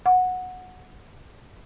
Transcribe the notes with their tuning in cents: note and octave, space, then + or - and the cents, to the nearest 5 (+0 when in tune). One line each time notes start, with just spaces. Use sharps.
F#5 -15